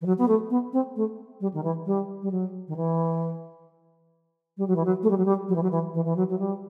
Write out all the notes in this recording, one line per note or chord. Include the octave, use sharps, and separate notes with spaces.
E3
F#3
B3
A3
B3
C4
A3
G3
D#3
E3
G3
G3
F#3
D#3
E3
G3
F#3
E3
F#3
A3
G3
F#3
G3
F#3
E3
F#3
E3
E3
E3
F#3
F#3
G3